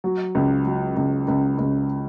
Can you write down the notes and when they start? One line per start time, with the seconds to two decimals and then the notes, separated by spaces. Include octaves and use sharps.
0.04 F#3
0.35 C#2
0.66 F#3
0.97 C#2
1.28 C#2
1.58 C#2